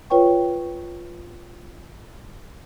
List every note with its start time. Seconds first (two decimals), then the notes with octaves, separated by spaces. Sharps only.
0.10 F4 B4 C#5 G5 C#6